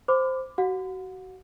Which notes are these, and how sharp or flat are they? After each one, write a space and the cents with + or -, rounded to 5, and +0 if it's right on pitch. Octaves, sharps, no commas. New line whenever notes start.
C5 +0 B5 +35 D6 +0
F#4 +30 F#5 -35